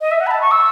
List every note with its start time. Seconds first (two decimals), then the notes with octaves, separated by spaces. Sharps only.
0.01 D#5
0.11 E5
0.21 F#5
0.27 B5
0.31 A5
0.41 C#6
0.51 E6